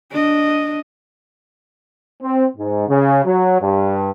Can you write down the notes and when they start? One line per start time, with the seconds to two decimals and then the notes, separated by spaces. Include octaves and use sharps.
0.11 D4 D#5
2.21 C4
2.57 G#2
2.88 C#3
3.26 F#3
3.61 G2